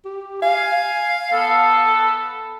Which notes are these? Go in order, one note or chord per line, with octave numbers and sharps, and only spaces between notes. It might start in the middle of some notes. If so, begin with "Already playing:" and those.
G4
F5 G#5
B3 A4